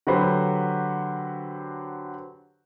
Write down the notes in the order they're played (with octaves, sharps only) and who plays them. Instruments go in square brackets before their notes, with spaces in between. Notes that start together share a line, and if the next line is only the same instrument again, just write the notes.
[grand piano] D3 F#3 F#4 G4 B4 C5